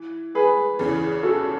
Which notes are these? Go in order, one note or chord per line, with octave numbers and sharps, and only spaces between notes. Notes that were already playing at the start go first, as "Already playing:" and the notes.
Already playing: E3
G#4 B4
E2 C#3 E3
F#4 A4